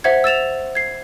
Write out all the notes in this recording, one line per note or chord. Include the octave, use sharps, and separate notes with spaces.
C5 E5 F#5 G#6
E6 A6 E7 F7
G#6 C7